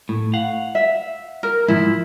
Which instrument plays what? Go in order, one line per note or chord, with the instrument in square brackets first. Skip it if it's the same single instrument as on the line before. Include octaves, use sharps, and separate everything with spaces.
[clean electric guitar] A2
F5 F#5
[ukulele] E5
A#4
[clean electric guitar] G#2 F3 [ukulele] E4